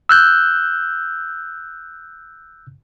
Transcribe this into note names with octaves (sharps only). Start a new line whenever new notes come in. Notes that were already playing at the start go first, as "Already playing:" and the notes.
E6 F#6 G6